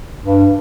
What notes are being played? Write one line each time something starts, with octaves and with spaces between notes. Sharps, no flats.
G2